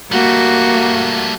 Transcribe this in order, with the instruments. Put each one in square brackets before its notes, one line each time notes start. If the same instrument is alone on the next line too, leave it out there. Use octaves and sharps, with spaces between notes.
[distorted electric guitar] G3 A3 [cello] A#3 [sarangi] F#4